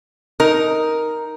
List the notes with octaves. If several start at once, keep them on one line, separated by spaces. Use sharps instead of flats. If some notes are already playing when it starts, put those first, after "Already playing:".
D#4 A#4